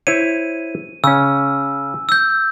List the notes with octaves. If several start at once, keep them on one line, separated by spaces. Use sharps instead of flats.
E4 C5 C#5 D#7
C#3 C#4 E6
E6 G6